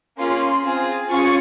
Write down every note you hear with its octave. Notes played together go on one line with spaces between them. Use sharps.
A#3 C#4 F4 G#4 C6
C4 F4 G#4
C#4 F4 G#4 C#6